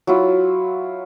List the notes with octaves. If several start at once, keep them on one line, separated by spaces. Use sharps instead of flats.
F#3 E4 F4